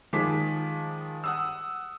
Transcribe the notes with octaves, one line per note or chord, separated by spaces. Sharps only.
D#3 F3 G#3 D6 B6
F#5 D#6 E6